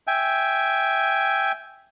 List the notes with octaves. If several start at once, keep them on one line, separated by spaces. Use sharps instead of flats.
E5 G5 G#5